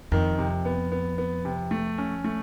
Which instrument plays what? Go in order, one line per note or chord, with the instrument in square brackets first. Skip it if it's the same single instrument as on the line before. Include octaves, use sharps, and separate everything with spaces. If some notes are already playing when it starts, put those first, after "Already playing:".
[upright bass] F2 [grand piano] D#3
[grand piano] C3
B3
B3
B3
C3
A3
C#4
A3